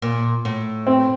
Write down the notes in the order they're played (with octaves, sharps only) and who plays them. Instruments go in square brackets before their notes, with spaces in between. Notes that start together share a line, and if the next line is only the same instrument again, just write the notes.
[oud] A#2
A2
[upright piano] C4